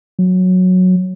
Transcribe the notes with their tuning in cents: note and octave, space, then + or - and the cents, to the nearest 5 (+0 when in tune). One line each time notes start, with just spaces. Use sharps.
F#3 -10